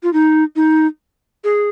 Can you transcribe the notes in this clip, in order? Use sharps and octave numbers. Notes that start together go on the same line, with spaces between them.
F4
D#4
D#4
G#4